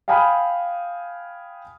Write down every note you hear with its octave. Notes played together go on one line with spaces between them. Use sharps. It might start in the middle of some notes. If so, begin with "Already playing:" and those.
F5 G5 G#5 B5 D#6 F6